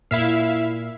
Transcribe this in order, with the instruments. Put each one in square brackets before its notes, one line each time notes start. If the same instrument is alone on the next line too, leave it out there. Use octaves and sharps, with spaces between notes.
[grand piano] A#2 [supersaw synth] E4 E5 F5